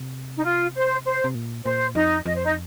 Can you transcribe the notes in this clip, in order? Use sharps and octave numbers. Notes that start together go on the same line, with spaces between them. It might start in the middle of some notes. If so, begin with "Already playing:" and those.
Already playing: C3
D#4
F4
C5
C5
C3
A#2
A#2 C5
F2 D#4 D#5
F2 D#5
C5
D#4 D#5